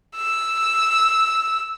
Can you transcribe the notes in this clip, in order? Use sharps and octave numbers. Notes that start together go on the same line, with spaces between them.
E6